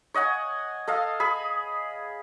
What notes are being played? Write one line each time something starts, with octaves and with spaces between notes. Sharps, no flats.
C#5 D#5 F#5 G#5
A4 D#5 F5
G#4 B5